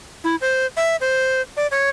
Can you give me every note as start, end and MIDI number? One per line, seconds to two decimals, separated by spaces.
0.24 0.35 64
0.41 0.66 72
0.77 0.96 76
1.01 1.41 72
1.57 1.67 74
1.71 1.89 73